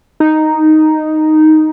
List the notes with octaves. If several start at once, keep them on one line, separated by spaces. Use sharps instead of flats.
D#4